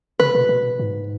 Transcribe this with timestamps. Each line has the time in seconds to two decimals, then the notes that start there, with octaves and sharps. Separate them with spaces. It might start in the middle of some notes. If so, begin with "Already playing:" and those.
0.19 C#3 B4
0.35 B2
0.49 B2
0.79 G#2